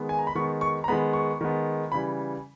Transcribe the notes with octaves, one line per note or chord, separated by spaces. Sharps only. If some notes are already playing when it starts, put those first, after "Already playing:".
Already playing: D#3 G#3 B3
G#5
A#5
B5
D#3 G#3 B3 C#6
C#6
A#5
D#3 G#3 B3 B5
C#6
D#3 G#3 B3
C#3 E3 G3 B5